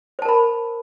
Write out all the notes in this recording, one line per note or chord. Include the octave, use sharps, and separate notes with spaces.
A#4 C5 A5 B5